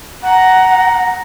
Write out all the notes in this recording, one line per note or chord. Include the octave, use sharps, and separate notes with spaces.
F#5 A#5